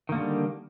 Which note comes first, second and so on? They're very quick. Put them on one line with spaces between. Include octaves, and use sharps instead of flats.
D#3 A#3 D3 G3